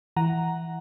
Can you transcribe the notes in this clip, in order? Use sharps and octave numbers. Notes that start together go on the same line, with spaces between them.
E3 F#5 A#5